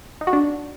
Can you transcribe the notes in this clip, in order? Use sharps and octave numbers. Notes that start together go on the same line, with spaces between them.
D#4
F#4
D4